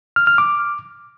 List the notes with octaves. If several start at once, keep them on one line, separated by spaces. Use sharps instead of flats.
F6
F6
D6